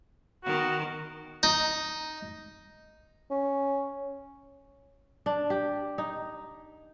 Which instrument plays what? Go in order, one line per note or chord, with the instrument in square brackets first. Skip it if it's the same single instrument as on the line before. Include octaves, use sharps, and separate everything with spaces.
[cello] D#3 B3 [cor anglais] F#4
[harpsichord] D#4
[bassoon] C#4
[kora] D4
G4
D#4